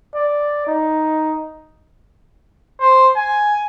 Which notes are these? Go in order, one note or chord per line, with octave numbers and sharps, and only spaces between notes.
D5
D#4
C5
G#5